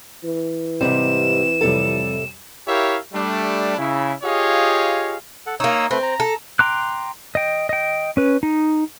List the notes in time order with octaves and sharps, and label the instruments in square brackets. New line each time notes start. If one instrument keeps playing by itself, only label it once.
[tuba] E3
[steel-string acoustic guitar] G#2 C3 G3 [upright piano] C4 [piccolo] E7
[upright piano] F2 G3 [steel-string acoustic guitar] A2 C3 A4
[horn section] E4 G4 A#4 C#5 E5 F5
G3 A3 D4
C#3 E4
F4 G4 G#4 C#5 D#5 F5
[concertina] A4 F#5
[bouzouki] A#3 D#4 [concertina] C#5 D#6 E6
[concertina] A3 B4 [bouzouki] C4
[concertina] A#5
[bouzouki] A4
[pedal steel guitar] G5 A#5 C6 D6 F#6
D#5 G5
D#5 G5
C#4 B4
D#4